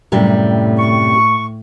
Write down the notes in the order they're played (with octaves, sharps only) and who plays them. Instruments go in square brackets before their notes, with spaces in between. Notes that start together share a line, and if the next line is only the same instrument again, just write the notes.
[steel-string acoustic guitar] F#2 C3 G3 [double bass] A2
[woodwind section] C#6